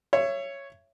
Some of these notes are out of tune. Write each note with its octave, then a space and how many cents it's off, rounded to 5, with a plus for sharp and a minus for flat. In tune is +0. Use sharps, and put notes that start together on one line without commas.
C#5 +0 E5 +30